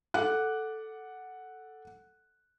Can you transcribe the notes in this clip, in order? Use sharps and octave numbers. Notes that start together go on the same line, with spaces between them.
A4 F#5 D6 F#6